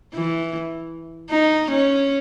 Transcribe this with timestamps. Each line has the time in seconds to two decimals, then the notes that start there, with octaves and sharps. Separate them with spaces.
0.14 E3
1.31 D#4
1.71 C#4